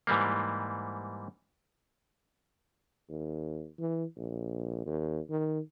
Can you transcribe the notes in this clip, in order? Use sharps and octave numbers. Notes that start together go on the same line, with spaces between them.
G#2 E3 G3 A#3
D#2
E3
A#1
D#2
D#3